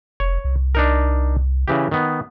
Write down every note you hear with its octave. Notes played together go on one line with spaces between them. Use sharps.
F1 C#5
C2
D4 D#4 A#4
C#3 E3 G4
D#3 B3